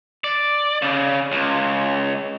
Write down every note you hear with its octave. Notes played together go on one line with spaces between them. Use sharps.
D5
C#3
C#2